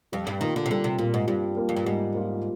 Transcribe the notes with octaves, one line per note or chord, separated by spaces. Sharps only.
F2 G3
G2
D#3 A#3 F4
D3
C3
D3 G3
C3
A#2 A#3 F4
G#2
G2 G3
A#3 F4
F2
G2
G#2 G3
A#3 F4